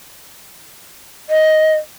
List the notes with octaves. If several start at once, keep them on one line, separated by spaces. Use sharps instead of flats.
D#5